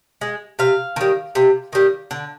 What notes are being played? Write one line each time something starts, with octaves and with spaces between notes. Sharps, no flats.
G#3
C3 F5
D#3 G3
C3
D#3 G3
D3